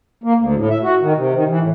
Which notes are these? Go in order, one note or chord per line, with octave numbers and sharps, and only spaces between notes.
A#3
D2
A2
E5
F#4
D#3
C3
D#3
E3
A2